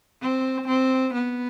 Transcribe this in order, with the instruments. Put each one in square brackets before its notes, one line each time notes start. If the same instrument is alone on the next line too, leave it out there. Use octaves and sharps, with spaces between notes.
[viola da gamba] C4
C4
B3